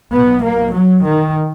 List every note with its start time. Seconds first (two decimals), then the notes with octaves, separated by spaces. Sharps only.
0.14 B1 B2 B3
0.45 A#3
0.76 F#3
1.06 D#3